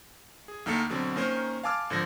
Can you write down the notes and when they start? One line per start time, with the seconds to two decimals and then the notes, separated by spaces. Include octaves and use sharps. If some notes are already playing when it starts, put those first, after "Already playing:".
0.48 G#4
0.66 D2 D#3 A#3 A4 C#7
0.90 B2 D3 F#3 C4
1.16 D#3 A#3 C#4 A#4 C5
1.64 F5 G#5 A5 D6 E6 F6
1.90 G#1 D3 F3 A#6